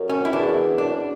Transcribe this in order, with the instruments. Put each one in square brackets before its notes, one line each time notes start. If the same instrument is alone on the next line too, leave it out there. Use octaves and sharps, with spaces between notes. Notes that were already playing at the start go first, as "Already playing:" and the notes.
Already playing: [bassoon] F#2
[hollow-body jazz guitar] C#4
E4
[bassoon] E2 [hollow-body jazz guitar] D4
[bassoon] F#2 [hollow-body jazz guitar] D4